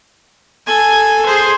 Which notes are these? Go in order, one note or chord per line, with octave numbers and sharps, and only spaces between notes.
A4 G#5
G#4 C5